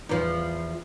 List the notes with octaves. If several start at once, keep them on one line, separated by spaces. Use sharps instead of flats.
E2 F3